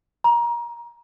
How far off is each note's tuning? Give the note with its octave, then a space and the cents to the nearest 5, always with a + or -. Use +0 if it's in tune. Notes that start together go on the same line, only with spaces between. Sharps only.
A#5 +25